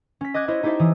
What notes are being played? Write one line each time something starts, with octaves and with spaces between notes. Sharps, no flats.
C#4 B6
D#5 D6 F#6 G#6
E4 C5 C#5 D#5
D#4 E4 G4 A4 C5 E5
E3 D#6